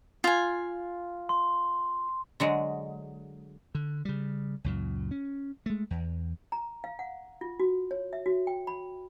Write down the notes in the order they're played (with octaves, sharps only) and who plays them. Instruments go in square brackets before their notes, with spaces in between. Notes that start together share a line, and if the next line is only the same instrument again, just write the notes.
[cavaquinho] F4 G#5
[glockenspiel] C6
[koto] D3 F#3 G#3
[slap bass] D3
C#3 G3
C#2 F#2 A#2
C#4
G#3 A3
E2
[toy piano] A#5
F5
F#5
F4
F#4
C#5
E5
F#4
G5
B5